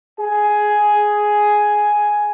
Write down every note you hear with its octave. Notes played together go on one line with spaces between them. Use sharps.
G#4 G#5